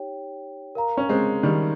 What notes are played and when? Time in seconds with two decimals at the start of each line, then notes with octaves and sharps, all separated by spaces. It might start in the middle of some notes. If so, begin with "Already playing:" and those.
Already playing: D#4 G4 C#5 G5
0.75 A#4 F5 A#5
0.97 C#4
1.09 G#3 C4
1.43 D#3 G3